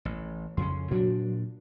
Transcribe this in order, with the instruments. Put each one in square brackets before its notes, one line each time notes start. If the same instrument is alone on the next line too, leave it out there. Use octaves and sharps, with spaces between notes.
[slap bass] A1
[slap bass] F2 C#3 C#4 [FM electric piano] C6
[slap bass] A#2 D4 [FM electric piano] F#3